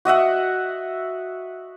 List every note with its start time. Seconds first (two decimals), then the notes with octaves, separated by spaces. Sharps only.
0.05 F#4 D#5 E5 F#5